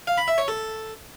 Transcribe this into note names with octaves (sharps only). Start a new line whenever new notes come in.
F5
B5
E5
C#5
A4